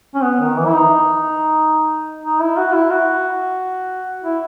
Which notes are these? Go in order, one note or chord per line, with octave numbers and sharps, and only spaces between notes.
C#4
B3
D#3
E3
E4
D#4
D#4
E4
F#4
E4
F#4
E4